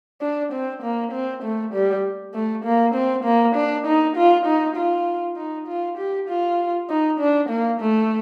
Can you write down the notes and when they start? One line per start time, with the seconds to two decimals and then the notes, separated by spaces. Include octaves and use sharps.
0.21 D4
0.52 C4
0.83 A#3
1.12 C4
1.43 A3
1.74 G3
2.34 A3
2.65 A#3
2.95 C4
3.24 A#3
3.55 D4
3.86 D#4
4.16 F4
4.46 D#4
4.76 F4
5.37 D#4
5.68 F4
5.98 G4
6.28 F4
6.90 D#4
7.20 D4
7.49 A#3
7.81 A3